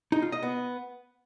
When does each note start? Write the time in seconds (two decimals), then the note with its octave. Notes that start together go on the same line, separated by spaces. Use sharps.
0.12 D#4
0.22 F4
0.32 D#5
0.43 B3